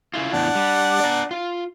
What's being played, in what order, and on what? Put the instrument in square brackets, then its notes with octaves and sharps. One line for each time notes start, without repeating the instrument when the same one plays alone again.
[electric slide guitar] C#3 E4 F4
[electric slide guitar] E2 A2 [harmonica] D4 F#5
[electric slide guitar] G3
D5 A#5
F4